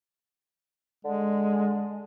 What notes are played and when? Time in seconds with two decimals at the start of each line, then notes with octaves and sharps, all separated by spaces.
1.05 D3 G#3